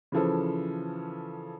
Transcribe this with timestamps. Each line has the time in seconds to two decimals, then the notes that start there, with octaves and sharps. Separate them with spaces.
0.12 C#3 E3 F3 A4